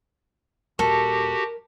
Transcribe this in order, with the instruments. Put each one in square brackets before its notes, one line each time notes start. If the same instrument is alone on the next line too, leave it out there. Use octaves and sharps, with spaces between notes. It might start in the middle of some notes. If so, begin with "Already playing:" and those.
[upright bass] D#1 [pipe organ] F#4 G4 [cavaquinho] A4 [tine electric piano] A#4